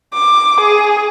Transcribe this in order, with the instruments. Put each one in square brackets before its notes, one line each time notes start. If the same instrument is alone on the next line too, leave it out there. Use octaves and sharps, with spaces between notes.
[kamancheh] D6
G#4